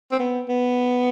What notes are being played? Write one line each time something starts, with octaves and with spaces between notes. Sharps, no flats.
C4
B3
B3